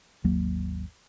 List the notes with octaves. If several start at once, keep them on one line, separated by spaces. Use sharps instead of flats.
G#1 D#2 F#3 A#3